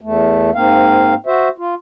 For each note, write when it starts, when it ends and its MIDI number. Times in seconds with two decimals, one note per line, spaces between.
0.01 0.51 40
0.01 0.51 57
0.54 1.14 44
0.54 1.14 58
0.54 1.14 60
0.54 1.14 77
1.26 1.49 66
1.26 1.49 72
1.26 1.49 76
1.58 1.75 65